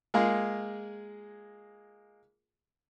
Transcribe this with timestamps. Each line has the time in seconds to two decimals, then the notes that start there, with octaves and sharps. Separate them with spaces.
0.14 G#3 A#3 F4 G#4